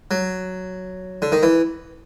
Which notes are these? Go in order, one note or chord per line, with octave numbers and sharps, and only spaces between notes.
F#3
D3
D#3
E3